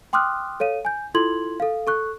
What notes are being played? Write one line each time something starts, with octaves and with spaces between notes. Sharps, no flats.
G5 C6 D6 D#6 F6 F#6
A4 C#5 F5 D#7
G#5 G6
E4 F4 A4 C6 G#6 F#7
A4 F5
A4 C#6 F#6